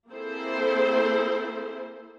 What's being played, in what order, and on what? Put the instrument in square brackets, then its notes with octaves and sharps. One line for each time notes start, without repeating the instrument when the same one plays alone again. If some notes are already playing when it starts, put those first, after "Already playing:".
[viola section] A#3 C4 E4 G#4 A4 C5